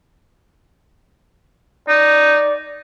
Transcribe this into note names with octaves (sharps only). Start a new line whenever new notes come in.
D#4 D5